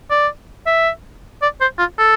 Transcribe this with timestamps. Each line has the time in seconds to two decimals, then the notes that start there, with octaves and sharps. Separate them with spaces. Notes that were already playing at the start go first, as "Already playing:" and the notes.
0.10 D5
0.67 E5
1.42 D5
1.61 C5
1.79 F4
1.98 A4